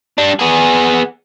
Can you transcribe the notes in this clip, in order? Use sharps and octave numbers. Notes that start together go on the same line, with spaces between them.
G3 D4
B3 G#4